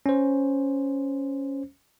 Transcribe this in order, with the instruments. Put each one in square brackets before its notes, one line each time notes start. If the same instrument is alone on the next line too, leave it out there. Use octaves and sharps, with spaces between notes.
[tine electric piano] C#4 C5